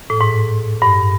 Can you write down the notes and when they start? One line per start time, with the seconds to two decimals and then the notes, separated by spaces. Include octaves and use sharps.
0.10 A2
0.21 G#2
0.82 G2